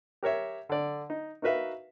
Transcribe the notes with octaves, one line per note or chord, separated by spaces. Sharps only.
G4 A#4 C#5 E5
D3 D5
D#4
D#4 F#4 A#4 B4 E5 F5